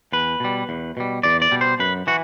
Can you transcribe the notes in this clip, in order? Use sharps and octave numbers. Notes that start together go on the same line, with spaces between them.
E2 B4
B2 G3
E2
B2 G3
E2 D5
D5
B2 G3
C5
F#2 B4
E3 F#4